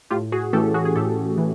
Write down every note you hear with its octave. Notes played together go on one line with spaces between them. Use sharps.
A2 F4 G4
F#4 G#4
E3 A3 C#4 G4 A4
F#4 G#4
G#4
A2 G4 A4
E3